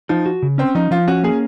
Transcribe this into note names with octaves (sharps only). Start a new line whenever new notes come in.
F3 D#4
F#4
C#3
C4 C#4
F3 D#4
F3 F4
C#4 F#4
A#3 G#4